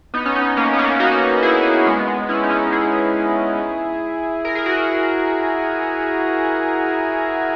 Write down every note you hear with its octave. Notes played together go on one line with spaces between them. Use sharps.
B3 D#4
C#4
B3 D#4
A#3 C#4
B3
A#3 C#4
D#4 F#4
E4 G#4
G#3 B3
G#3
C#4 E4
D#4
C#4 E4
E4 G#4
A#4
G#4
F#4 A#4